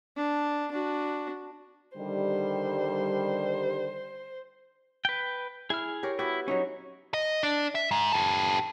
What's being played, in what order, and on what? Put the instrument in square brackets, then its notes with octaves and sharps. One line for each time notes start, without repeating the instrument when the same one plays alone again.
[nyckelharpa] D4
D4 F#4
[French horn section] D3 D#3 G3 [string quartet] C5
[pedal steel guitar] B4 G5
[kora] E4 [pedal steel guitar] G#4 F6
[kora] G4 A#4 C#5
[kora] B3 F#4 G4 [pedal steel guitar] E4
[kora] F#3 C#5 [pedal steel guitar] C#4 D#4
[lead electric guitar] D#5
D4
E5
G#2
G4 A4